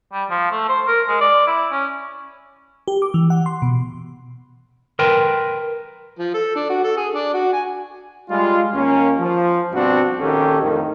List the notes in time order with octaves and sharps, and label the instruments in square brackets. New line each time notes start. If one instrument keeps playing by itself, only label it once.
[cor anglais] G3
F3
A3
C5
A#4
G#3
D5
E4
C#4
[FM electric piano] G4
D6
E3
F#5
C6
B2
[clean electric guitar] A#4 B4 G5 C6
[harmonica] F3
A4
D4
F#4
A4
G#4
D4
F#4
G#5
[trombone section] G3 G#3 F4
D#2 A#3 C#4
F3
G2 B2 C4 D4 F#4
A#1 D#3 C#4 G4 A4
F2 A2 D#3